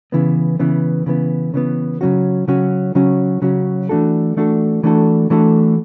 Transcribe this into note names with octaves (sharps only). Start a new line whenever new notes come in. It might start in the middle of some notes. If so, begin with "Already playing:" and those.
C#3 E3 B3
C#3 E3 B3
C#3 E3 B3
C#3 E3 B3
C#3 F#3 C#4 F#4
C#3 F#3 C#4 F#4
C#3 F#3 C#4 F#4
C#3 F#3 C#4 F#4
E3 A3 D4 F#4 A4
E3 A3 D4 F#4 A4
E3 A3 D4 F#4 A4
E3 A3 D4 F#4 A4